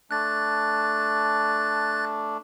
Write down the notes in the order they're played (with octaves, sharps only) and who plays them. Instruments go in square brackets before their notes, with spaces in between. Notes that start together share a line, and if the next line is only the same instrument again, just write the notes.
[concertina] A3 D4 [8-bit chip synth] F#6 A6